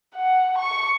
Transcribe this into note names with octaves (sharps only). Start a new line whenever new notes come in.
F#5
C#6